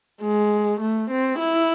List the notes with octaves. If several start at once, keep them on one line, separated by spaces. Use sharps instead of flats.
G#3
A3
C4
E4